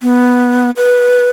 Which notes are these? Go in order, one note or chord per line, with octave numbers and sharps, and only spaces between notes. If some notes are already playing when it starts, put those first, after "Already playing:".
B3
B4